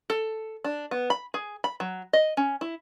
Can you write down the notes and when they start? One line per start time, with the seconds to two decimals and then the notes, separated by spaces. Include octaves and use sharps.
0.10 A4
0.64 D4
0.91 B3
1.10 B5
1.34 G#4
1.64 B5
1.80 F#3
2.13 D#5
2.37 C#4
2.61 E4